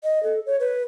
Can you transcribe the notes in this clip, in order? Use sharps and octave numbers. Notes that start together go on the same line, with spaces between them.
D#5
A4
C#5
B4